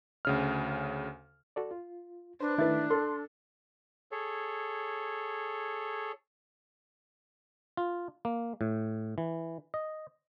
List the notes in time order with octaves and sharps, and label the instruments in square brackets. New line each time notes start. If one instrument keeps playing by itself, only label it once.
[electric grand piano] D2 C#3 F6
[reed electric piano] F#4 A4 D5
F4
[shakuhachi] D4 [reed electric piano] B4 C5
[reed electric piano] D#3 A3 A6 [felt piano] E4 B4
[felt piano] A4 [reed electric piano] C6
[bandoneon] G#4 A4 C#5
[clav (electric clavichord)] F4
A#3
A2
E3
D#5